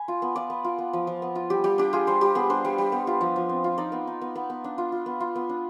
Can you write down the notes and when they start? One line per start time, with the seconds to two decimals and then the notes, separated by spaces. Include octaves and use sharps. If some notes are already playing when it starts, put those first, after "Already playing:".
Already playing: G#5 B5
0.08 F4
0.22 B3
0.36 F4 D5
0.50 B3
0.65 F4
0.79 B3
0.93 F3
1.07 F3
1.22 B3
1.35 F4
1.50 G3 G4
1.64 G3 G4
1.78 D4 G4
1.93 F4 G#4
2.07 G3 C5
2.21 G3 G4
2.35 B3 G#4
2.50 D4 C5
2.65 G3
2.78 G3
2.92 B3
3.07 F4
3.21 F3
3.36 F3
3.49 C4
3.64 F4
3.78 D#4 D5
3.92 B3
4.07 D#4
4.22 B3
4.35 B3
4.50 B3
4.64 D4
4.78 F4
4.92 F4
5.06 B3
5.21 F4
5.36 B3
5.49 D4